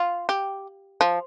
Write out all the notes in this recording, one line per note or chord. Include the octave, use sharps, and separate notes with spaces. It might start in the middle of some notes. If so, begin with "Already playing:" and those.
Already playing: F4
G4
F3